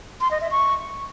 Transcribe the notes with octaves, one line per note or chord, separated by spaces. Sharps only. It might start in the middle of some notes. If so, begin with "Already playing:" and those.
C6
D#5
E5
C#6